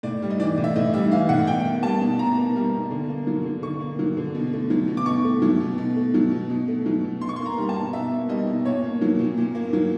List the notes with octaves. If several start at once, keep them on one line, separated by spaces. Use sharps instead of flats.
A2 D5
G3
D#5
E3 D5
A2
E5
A2 D#5
G3 E5
E3 F5
A2 F#5
B2 G5
A#3
G3 A5
B2
B2 A#5
A#3
G3
B2
D3
A#3
F#3
D3
D3 C#6
A#3
F#3
D3
B2
A3
F#3
B2
D6
B2 C#6
A3
F#3
B2
B2
A3
F#3
B2
B2
A3
F#3
B2
B2 C6
C#6
A#3 C6
A#5
G3
A5
B2
B2 E5
A#3
G3 D#5
B2
A#2 C#5
A#3
F#3
A#2
A#2
A#3
F#3